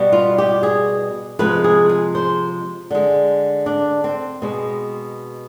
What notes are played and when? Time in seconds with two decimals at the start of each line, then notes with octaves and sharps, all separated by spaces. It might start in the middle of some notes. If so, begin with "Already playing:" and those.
Already playing: B2 G3
0.12 F4
0.38 G4
0.63 G#4
1.39 C3 F3 G#3 B4
1.64 G#4
1.89 G#4
2.15 C5
2.90 D3 G#3
3.66 D4
4.04 C4
4.42 B2 G#3